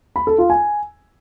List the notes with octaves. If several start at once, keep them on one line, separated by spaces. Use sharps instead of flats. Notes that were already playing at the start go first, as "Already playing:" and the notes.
B5
A4
F4
G#5